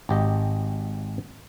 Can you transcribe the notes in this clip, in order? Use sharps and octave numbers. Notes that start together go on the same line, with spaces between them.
G#1 G4 D#5